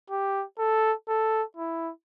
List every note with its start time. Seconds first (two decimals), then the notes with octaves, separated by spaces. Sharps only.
0.10 G4
0.59 A4
1.08 A4
1.57 E4